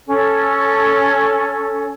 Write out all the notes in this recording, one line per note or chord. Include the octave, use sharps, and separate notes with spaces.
C#4 A4